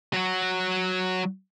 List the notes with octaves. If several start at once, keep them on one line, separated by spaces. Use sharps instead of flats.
F#3 F#4